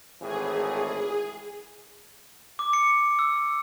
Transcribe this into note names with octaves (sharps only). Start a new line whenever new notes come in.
G#1 A2 E3 G#4
D6
C#7
E6